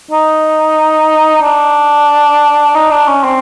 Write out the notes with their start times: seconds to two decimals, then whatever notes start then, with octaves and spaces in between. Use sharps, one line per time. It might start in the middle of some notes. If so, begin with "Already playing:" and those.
0.11 D#4
1.42 D4
2.75 D#4
2.91 D4
3.07 C#4
3.24 C4